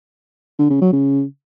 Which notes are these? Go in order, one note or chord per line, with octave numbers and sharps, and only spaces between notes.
D3
C#3
F#3
C#3